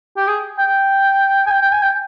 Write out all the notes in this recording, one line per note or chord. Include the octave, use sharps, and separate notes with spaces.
G4
G#4
G5
G#5
G5
G5
G#5
G5